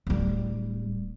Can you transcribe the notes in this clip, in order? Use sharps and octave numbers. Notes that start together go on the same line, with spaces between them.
D1 G3